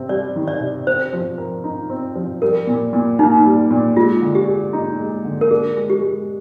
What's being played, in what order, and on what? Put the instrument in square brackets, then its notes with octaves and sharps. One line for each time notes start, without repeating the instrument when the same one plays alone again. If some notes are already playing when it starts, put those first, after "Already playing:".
Already playing: [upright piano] C3 C4
[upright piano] G3 [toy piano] D5
[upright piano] D#3
[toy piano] D5
[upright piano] C3
[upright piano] C4 [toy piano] C5
[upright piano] F3
A#4
D#4
C4
F3
[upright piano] G3 [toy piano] A#4
[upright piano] A#2
A#2
[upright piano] A#3 [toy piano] D#4
[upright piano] G3
A#2
[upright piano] G#3 [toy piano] F4
[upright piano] D3
[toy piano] G4
[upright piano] G#4
D#4
G#3
D3
[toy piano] A#4
[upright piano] D4 [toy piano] G#4
[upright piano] G#3
[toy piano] G4
[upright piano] G#3